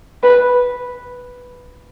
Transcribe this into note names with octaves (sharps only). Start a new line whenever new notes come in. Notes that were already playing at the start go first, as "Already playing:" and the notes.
B4